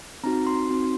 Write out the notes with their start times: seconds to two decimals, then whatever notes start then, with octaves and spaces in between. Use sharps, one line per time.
0.23 C4 D#4 F#4 A#5
0.47 C6
0.70 C4 D#4 F#4